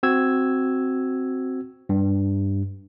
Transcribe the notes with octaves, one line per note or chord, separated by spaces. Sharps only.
C4 F#4 E6 G#6
G2